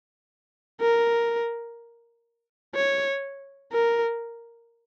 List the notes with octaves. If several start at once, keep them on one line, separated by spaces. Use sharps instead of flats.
A#4
C#5
A#4